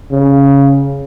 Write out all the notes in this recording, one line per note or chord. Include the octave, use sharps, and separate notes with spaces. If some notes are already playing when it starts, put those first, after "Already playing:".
C#3